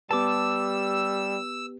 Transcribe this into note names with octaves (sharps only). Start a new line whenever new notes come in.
G3 B3 G4 B4 A5 D6 E6